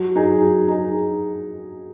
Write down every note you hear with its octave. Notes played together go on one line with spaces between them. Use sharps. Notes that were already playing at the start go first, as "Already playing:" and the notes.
Already playing: F#3
D#4 G#4
F#3
D#4 G#4